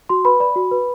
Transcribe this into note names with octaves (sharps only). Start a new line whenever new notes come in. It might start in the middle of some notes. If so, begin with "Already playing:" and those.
F#4 C6
B4 B5
D5 B5
F#4
B4